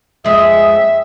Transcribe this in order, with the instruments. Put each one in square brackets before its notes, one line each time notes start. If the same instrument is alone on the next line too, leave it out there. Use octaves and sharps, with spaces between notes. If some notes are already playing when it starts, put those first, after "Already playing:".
[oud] F2 G#3 [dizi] E5